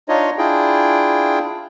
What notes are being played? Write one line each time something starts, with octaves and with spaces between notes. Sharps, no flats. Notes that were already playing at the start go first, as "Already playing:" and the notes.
D4 D#4 F4 C#5 D#5
D4 E4 F4 G#4 G5